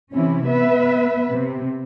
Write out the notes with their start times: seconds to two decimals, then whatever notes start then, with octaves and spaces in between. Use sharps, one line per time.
0.12 C3 E3 C#4 E4
0.46 B3 B4 E5
1.31 C3